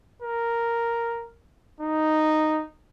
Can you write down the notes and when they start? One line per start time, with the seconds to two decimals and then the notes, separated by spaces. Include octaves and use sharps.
0.22 A#4
1.80 D#4